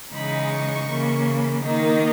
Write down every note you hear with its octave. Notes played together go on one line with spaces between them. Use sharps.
C#3 E3 G#3 D#4 B5
C#6
C#3 E3 A#3
D#3 A#3 D#4